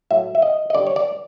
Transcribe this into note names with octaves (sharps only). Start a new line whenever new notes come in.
A2 F#3 E5
E5
D#5
D#5
D3 G3 D5
C#5
D5